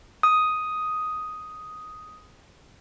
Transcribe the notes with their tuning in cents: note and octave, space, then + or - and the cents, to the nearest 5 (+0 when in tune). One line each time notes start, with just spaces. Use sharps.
D#6 +5